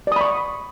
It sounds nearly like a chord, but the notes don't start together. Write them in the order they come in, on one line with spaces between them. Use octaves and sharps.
D5 D#6 B5 C#6